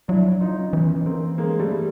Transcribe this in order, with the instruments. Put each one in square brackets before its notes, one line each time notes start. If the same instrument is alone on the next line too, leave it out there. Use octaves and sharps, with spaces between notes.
[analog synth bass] F#3 [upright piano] D4 E4
[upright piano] D#4 F4
C#4 D#4
[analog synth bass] E3 [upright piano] B3 C#4
[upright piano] A#3 C4
G#3 A#3
G3 A3